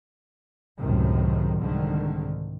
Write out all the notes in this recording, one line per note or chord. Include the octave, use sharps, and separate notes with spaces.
C#2 F#2 A2 C3 D#3
C2 G#2 D3 D#3